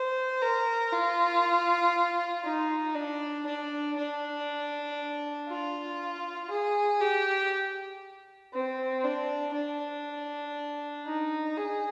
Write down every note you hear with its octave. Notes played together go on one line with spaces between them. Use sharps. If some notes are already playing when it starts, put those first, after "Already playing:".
Already playing: C5
A#4
F4
D#4
D4
D4
D4
F4
G#4
G4
C4
D4
D4
D#4
G#4